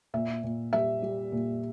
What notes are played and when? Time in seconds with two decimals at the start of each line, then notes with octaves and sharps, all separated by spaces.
0.14 A#2 E5
0.44 A#2
0.73 G3 E5
1.02 G3
1.32 A#2